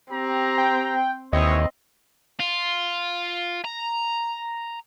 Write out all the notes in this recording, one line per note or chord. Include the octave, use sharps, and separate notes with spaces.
C4 G4 A#5
G5
D#2 E3 C4 E4 C#5 D#5
F4
A#5